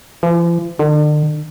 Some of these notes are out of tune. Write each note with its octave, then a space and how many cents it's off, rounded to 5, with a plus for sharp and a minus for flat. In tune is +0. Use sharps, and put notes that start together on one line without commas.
F3 -45
D3 +40